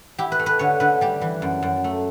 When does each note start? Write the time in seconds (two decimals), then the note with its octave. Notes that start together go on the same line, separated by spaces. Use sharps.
0.19 E4 G4
0.32 B4
0.39 A3
0.46 B4
0.59 D3 C#5
0.80 D3 B4
1.01 G3 G4
1.21 E3
1.42 F#2
1.63 F#2
1.84 A3